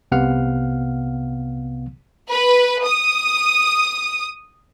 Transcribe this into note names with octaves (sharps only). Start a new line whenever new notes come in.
C2 C3 B3 F5 F#5 F6
B4
D#6